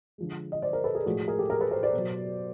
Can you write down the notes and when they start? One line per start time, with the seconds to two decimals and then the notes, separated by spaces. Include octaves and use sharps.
0.18 D3 F3 G#3
0.52 D#5
0.62 C5 D5
0.73 A#4 C5
0.84 A4 B4
0.95 G#4 A#4
1.06 A2 F3 G#3 F#4 G#4
1.28 G#4 A#4
1.39 G4 A4
1.50 G#4 A#4
1.61 A4 B4
1.71 A#4 C5
1.83 C5 D5
1.93 B2 F#3